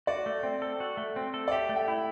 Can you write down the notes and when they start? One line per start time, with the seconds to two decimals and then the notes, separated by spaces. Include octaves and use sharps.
0.07 F#4 D5
0.26 A3
0.43 C4
0.62 A4
0.80 F#4
0.97 A3
1.16 C4
1.34 A4
1.48 D5
1.51 G4 E5
1.69 A3
1.76 G5
1.88 E4